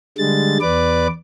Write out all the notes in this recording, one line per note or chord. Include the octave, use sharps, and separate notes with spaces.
D3 G3 G#3 A6
E2 B4 D5 D6